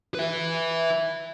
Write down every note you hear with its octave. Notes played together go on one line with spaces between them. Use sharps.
B4 E5